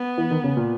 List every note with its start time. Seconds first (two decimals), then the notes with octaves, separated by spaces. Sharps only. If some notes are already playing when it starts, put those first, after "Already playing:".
Already playing: B3
0.18 E3
0.31 D#3
0.44 C#3
0.57 A#2